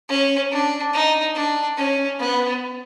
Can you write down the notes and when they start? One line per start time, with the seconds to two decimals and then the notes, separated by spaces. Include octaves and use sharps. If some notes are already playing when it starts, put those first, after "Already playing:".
0.09 C#4
0.52 D4
0.93 D#4
1.35 D4
1.77 C#4
2.20 B3